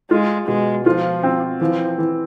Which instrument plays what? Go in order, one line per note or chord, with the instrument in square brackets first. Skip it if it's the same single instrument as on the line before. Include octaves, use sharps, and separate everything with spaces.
[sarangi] G#3 [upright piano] F4
[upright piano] B2 [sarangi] G#3
[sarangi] F3 [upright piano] F4
[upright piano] C4
[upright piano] E3 [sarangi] F3
[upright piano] E3